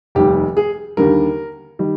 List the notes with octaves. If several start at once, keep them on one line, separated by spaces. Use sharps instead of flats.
F1 D#2 D#3 G3 G4
G#4
D#2 D3 G3 A#4
D#3 G3